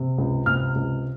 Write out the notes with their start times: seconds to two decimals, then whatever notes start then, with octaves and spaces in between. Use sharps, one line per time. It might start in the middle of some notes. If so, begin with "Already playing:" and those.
Already playing: C3
0.18 C#2
0.46 C3 F6
0.75 C#2